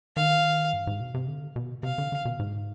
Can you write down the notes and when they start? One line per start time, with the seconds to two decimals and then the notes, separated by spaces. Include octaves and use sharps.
0.16 D#3 F5
0.73 G2
0.87 G#2
1.01 B2
1.14 C3
1.28 D3
1.56 B2
1.83 C3 F5
1.98 D3
2.12 D3
2.25 B2
2.39 G#2